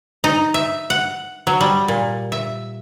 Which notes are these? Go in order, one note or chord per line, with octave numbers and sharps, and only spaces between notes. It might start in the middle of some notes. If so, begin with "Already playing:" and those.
D#4
E5
F#5
F#3
G3
A#2
E5